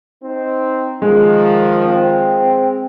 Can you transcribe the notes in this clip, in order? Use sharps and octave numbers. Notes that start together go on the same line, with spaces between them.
C4 D#4
D#3 F3 G#3
C4